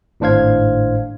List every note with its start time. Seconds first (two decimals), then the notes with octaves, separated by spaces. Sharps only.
0.20 G#1 A2 D4 C5 F5 G#6